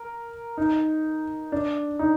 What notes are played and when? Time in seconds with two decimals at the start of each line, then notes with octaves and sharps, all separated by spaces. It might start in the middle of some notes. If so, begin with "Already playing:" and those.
Already playing: A#4
0.58 D#4
1.52 D4
1.99 D#4